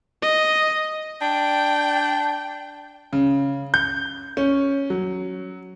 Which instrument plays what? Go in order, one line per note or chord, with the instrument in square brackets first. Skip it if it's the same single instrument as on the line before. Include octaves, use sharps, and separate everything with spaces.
[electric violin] D#5
[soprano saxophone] D4 [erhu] G5
[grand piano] C#3
G6
C#4
F#3